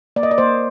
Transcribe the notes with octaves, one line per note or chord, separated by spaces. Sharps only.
A#3 D5
D#5
D5
A#3 C5